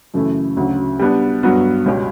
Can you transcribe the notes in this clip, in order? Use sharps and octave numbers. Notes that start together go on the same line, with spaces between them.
F#2 C#3 E3 A3 E4
D2 C#3 F#3
G3 B3 D4
G2 F#3 B3 F#4
C#2 B2 G3 C#4 G4